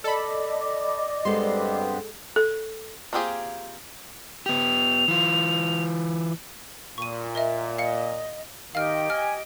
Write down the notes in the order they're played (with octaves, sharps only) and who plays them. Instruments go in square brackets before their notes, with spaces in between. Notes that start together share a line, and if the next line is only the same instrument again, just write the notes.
[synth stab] A4 B5 [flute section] D5 D#5 D6
[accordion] G2 B3 C4 [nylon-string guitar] G#3 A4 [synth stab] C6
[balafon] A4
[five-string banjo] A#3 C4 F4 G4 G#4
[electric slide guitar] B3 G4 [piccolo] F7
[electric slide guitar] E3 F4
[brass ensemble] A#2 [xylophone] C#6 D#7
[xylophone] A#4 D#5 E5
[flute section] D#5 [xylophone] F5 C#7
[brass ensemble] D#3 [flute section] G4 D#5 G5 [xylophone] F5 F6
[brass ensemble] G#5 [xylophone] F6